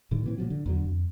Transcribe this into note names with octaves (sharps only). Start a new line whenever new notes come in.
A2 D3 D#3 G3
A#2 E3 C4
A#2 F3 F#3
D3
E2 D3 F#3
F2